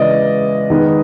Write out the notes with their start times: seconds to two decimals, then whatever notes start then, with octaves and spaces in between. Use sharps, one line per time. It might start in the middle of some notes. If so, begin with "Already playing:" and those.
Already playing: C#3 E3 G#3 B3 D5 D#5
0.70 D#3 G#3 B3